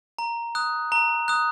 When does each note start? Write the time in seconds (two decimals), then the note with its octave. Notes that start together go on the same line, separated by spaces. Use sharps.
0.19 A#5
0.55 D#6 F#6
0.92 A#5
1.28 D#6 F#6